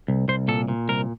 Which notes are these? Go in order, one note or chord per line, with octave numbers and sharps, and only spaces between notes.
C2
C2 C5
A#2 A4
A#2
C2 A#4